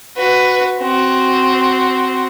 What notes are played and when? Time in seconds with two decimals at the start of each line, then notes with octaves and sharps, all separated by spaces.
0.16 F#4 B4
0.80 C4 F#4